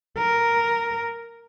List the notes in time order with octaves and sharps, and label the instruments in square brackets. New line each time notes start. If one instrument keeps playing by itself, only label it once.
[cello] A#4